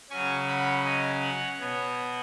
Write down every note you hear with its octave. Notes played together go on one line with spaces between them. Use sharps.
C#3 F#3 C#4 G#5 C#6
F#5 B5
D#5 G#5
C#5 F#5
B2 B3 C#5